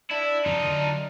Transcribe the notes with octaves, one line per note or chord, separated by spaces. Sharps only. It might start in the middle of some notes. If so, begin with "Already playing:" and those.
D4 E4
F2 C#3 D#4 F4
D3 F#3